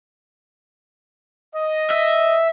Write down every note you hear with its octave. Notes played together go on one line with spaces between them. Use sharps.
D#5
E5